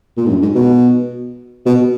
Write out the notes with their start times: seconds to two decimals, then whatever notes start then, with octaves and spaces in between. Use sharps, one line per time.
0.18 A#2
0.26 G#2
0.30 F#2
0.42 G#2
0.55 B2
1.66 B2